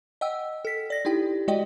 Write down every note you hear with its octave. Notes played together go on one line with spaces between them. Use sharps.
D#5 F#5 G5 E6
A4 B6
D5 A#6
D#4 E4 G4 G5
G#3 F#4 D5 D#5 G5